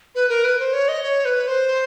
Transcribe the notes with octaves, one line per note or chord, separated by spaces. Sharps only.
B4
A#4
B4
C5
C#5
D#5
C#5
B4
C5